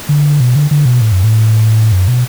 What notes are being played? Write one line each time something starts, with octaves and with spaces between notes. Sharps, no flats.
D3
B2
D3
D3
B2
A2
F#2
A2
F#2
B2